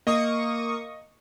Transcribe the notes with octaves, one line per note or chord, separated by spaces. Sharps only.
A#3 D#5 C#6 D#6